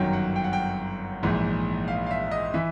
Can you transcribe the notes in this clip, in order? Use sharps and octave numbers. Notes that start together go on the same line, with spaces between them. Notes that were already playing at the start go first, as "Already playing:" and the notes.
Already playing: G1 F#2 D#3 F#3 G5
F#5
G5
F#5
G5
A#1 G#2 E3
F5
F5
E5
D#5
E3 E5